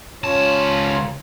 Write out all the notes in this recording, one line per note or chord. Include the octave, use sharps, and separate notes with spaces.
C#2 C#4 F4 C#5 A5